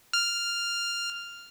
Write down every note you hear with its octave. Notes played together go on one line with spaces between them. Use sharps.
F6